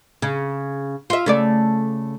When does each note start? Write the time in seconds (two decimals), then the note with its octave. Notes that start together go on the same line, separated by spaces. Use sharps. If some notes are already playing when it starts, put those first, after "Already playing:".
0.22 C#3
1.10 F4 E5
1.26 C#3 A3 D5